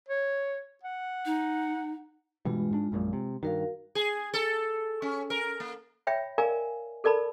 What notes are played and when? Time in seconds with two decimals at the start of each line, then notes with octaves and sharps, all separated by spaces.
0.08 C#5
0.83 F#5
1.26 D#4
2.45 G2 B2 E3 G#3 F4
2.71 G#2 D4
2.92 A#1 F#2 A#2
3.13 C3
3.43 G2 D#3 F#4 A#4 F5
3.95 G#4
4.34 A4
5.02 C#4
5.30 A#4
5.60 A#3
6.07 C#5 E5 G5 B5
6.38 A#4 D5 F5 G#5 A#5
7.04 A4 A#4 D5 A5 B5